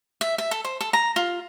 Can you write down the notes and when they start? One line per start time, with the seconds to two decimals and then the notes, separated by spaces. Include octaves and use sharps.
0.21 E5
0.38 E5
0.51 A4
0.64 C5
0.81 A4
0.93 A#5
1.16 F4